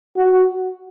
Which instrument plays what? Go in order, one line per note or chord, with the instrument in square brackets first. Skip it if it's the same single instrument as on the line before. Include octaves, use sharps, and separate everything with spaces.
[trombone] F#4